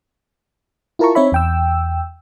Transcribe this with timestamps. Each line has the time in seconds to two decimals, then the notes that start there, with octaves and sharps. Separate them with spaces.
0.99 E4 F4 A#4 A5 A#5 C#6
1.15 C4 D#4 C#5 E5 B5
1.32 E2 G5 E6